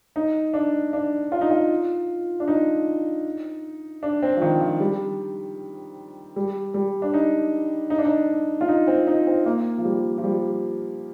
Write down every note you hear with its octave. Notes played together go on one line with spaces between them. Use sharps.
D#4
D4
D4
F4
D#4
F4
D4
D#4
D4
C4
F3
D#3
F3
G3
G3
G3
D4
D#4
D#4
D4
D#4
F4
D#4
C4
D#4
C4
A#3
F3
G3
F3
G3